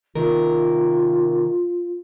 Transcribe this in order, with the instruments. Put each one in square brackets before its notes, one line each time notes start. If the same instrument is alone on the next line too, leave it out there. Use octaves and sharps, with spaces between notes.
[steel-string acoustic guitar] C3 D#3 A#4 [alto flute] F4